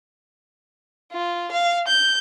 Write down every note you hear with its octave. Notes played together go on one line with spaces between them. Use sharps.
F4
F5
G6